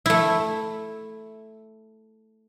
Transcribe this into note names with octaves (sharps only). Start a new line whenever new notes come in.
A3 E4